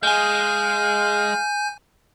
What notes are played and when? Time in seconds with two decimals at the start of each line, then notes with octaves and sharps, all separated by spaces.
0.03 G#3 F5 G#5 G6